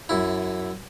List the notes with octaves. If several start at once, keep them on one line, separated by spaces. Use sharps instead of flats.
F#2 E4